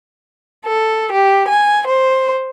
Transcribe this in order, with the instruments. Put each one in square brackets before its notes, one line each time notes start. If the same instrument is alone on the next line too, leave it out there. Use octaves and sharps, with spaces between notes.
[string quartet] A4
G4
G#5
C5